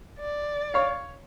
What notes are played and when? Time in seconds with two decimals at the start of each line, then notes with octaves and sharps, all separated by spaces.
0.20 D5
0.74 C#5 F5